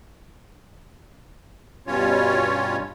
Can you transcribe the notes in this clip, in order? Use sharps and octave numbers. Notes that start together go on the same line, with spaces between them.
G2 B2 G3 C#4 F4 C#5